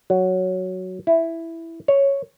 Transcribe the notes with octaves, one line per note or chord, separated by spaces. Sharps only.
F#3
E4
C#5